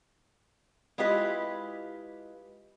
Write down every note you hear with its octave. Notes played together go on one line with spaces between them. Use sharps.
G#3 E4 F4 G4 B4 D#5